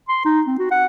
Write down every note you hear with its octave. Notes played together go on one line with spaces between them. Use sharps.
C6
D#4
C4
F#4
F#5